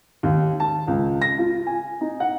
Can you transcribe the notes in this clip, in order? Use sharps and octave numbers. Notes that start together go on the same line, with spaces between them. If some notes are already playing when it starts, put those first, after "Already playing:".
D#2
A5
C#2
A#6
F4
G#5
D#4
F#5